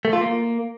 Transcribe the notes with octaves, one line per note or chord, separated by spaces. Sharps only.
A3
F4
A#3